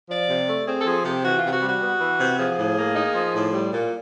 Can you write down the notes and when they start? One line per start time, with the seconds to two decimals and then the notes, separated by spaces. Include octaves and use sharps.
0.09 F3 D5
0.28 C3
0.48 A3
0.66 C4 G#4
0.81 A4
0.85 F3 G#4
1.04 C3 G4
1.23 E3 F#4
1.38 F4
1.43 C3 G4
1.52 F#4
1.61 G3
1.67 F#4
1.81 B3
2.00 E3
2.19 C3
2.38 F3 G#4
2.57 A2
2.76 A#3
2.95 D#4
3.14 F3
3.34 A2
3.53 G3
3.72 A#2